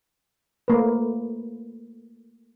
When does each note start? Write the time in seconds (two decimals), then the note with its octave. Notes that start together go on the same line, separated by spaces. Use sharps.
0.68 A3 A#3 B4